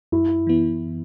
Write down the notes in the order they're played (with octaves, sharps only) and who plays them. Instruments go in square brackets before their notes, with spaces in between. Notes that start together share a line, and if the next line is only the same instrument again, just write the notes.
[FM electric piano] F#2 [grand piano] E4
[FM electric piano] E3 B3 E4